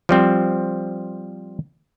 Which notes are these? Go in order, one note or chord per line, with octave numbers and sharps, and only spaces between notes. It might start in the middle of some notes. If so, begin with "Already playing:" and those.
F3 G3 C4